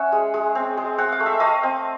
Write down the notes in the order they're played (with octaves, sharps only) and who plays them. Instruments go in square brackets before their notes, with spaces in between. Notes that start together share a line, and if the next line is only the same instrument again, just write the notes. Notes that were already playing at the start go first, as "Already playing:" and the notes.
Already playing: [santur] C#4 E5 F#5
G#3
G#3
C4
G#3
C4 F#5
F5
A3
E5
A3 D#5 F5
C4